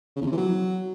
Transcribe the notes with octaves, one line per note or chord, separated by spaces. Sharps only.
C#3
E2
C3
E3
F#3